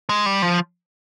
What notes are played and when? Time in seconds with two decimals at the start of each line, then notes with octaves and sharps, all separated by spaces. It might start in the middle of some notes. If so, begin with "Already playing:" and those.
0.09 G#3
0.26 G3
0.42 F3